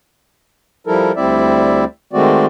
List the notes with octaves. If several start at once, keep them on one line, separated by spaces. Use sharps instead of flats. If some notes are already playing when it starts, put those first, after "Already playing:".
F3 G3 E4 A4 A#4
D2 G3 C4 E4 D5 E5
D#3 G#3 A3 C4 F#4 D5